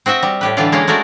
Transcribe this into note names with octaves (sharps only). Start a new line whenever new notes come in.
C4 F#4 D#5 E5 G5
G3
A2 G4 B4
D3 E3 G3 F4 D5
G#3 A#3 C#4 D#5 F5
G#3 A3 F#4 A#4 D5